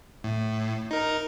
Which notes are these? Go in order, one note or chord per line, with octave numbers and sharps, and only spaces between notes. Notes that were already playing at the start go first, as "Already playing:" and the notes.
A2
D#4 A#4